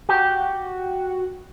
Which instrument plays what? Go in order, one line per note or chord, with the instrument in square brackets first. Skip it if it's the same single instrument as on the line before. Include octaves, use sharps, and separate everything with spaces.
[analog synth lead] F#4 [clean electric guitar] G4